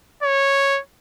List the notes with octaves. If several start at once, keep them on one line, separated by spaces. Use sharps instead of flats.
C#5